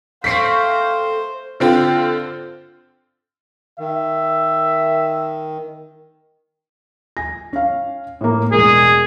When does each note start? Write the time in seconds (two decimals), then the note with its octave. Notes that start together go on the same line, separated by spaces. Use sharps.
0.24 A3 C4 C5 F5 B6 C7
1.60 D3 C4 F4
3.79 D#3 E5
7.17 G#5 A#6
7.53 C#4 F5
8.21 A2 A#3
8.52 E1 G#3 G#4 A#4